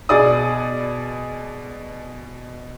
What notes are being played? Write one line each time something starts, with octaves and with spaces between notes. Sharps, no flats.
B2 G#4 D5 D#6